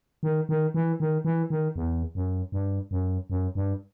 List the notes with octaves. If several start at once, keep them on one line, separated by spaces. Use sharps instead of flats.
D#3
D#3
E3
D#3
E3
D#3
E2
F#2
G2
F#2
F#2
G2